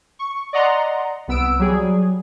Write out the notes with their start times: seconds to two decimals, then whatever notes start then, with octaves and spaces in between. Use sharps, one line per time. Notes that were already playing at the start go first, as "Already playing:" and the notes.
0.19 C#6
0.53 D5 D#5 F#5 A#5 C6
1.28 C2 B3 E6 D7
1.59 F#3 G3 G#4